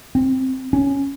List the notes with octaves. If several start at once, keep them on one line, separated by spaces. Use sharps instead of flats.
C4
C#4